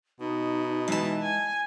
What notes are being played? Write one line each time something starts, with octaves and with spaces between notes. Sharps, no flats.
B2 D#4
E3 G#3 A5
G#5